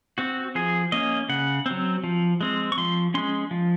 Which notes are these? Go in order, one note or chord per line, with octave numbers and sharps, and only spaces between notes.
C4 F#4
F3 G#4
A#3 C#4 D#5
C#3 F#5
F#3 C4
F3
G#3 C4
C#6
F3 C6
G#3 C#4 C6
F3